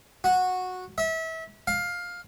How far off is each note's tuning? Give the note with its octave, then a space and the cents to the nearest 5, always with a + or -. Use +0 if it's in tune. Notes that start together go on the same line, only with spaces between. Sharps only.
F#4 -10
E5 -30
F5 +15